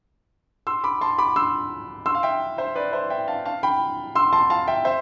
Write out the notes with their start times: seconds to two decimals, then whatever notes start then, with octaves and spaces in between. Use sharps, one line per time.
0.67 C6 E6
0.84 B5 D6
1.01 A5 C6
1.18 B5 D6
1.36 C6 E6
2.06 C6 E6
2.15 F5
2.23 E5 G5
2.58 C5 E5
2.75 B4 D5
2.93 C5 E5
3.10 E5 G5
3.28 F5 A5
3.45 F5 A5
3.63 G5 B5
4.15 C6 E6
4.33 A5 C6
4.50 F5 A5
4.68 E5 G5
4.85 C5 E5